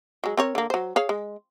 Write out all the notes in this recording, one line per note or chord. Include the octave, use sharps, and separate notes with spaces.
F#3 G#3
C4 A#4 C#5
D3 A#3
F#3 C5
G#4 C#5 F5
G#3